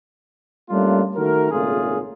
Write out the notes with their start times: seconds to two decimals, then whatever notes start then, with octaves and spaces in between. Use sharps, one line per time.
0.70 G3 A3 A#3 C#4 D4 F4
1.17 D#3 A3 F#4 A#4
1.52 G#1 A#2 C#3 A3 F4 G#4